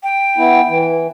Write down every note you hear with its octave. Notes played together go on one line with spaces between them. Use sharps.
G5
B3 E4
E3